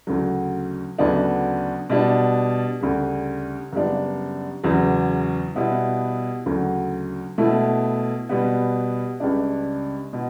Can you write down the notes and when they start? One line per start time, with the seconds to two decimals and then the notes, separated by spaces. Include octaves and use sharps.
0.07 D2 C#3 F#3
0.98 D2 C#3 F#3 B3 D4
1.90 B2 G3 D4
2.81 D2 C#3 G3
3.72 F#2 C#3 G3 B3 D4
4.64 E2 C#3 F#3
5.55 B2 G3 B3 E4
6.46 D2 C#3 F#3
7.38 B2 A3 E4
8.29 B2 G3 B3
9.20 C#2 C#3 G3 D4
10.13 B2